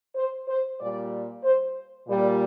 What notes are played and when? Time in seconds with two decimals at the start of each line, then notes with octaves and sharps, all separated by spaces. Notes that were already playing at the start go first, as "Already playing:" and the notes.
0.16 C5
0.48 C5
0.80 A#2 G3 D5
1.43 C5
2.06 A#2 G3